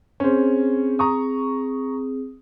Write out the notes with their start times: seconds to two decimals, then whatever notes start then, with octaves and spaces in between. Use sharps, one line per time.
0.20 C4 C#4 G#4 C5
0.99 A#5 C#6 D#6